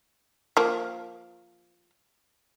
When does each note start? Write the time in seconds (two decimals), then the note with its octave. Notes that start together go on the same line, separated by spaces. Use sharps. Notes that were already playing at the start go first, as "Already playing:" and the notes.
0.57 F3 A#3